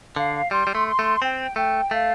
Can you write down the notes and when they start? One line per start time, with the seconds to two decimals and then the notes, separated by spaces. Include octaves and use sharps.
0.16 D3 F5
0.51 G3 C6
0.67 G3
0.75 A3
0.87 C6
0.99 A3
1.22 C4 G5
1.56 A3 G5
1.91 A3 F5